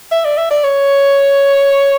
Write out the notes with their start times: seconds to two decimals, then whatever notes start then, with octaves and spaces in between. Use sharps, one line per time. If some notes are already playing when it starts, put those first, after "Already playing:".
0.12 E5
0.25 D5
0.38 E5
0.51 D5
0.64 C#5